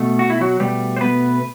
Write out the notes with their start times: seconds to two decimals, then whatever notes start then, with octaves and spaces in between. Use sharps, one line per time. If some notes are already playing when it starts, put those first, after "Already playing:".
Already playing: B2 A3
0.19 F#4
0.30 E4
0.41 F#3 F#4
0.60 B2 G3 A3 G4
0.96 C5
1.01 B3 B4